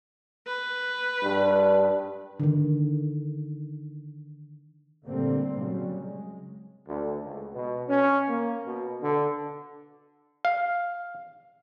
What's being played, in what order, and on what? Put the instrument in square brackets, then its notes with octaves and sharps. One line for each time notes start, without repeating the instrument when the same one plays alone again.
[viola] B4
[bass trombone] G2
[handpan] D3 D#3
[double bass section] A#2 D3 G3 A3 A#3 C4
C#3 F#3 G3
G#3
[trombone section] D2
C#2
B2
C#4
A#3
B2
D3
[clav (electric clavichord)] F5